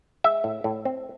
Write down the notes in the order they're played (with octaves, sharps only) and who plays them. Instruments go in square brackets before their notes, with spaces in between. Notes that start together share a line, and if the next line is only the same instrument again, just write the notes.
[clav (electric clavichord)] G#3 E5
A2
A2
C4